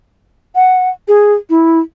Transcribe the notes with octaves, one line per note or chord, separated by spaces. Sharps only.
F#5
G#4
E4